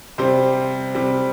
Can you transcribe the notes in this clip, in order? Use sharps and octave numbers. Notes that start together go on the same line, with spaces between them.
C3 G3 C5
C3 G3